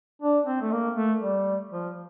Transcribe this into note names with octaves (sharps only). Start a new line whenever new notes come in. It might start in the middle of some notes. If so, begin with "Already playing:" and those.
D4
C4
A3
A#3
A3
G3
F3